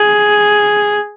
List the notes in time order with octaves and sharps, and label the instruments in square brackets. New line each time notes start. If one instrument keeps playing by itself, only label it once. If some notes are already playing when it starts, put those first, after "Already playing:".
Already playing: [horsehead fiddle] G#4